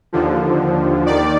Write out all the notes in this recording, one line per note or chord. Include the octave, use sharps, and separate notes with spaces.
D#2 D3 F3
D#2 D#3 D5